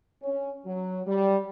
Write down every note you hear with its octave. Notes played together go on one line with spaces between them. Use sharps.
C#4
F#3
G3